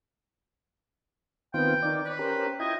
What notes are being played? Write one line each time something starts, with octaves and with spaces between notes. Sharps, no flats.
D#3 B3 C4 F4 G5
D#3 D5
B4 C#5
C#4 G4 A#4 C5
E4 F4 D#5 G5 G#6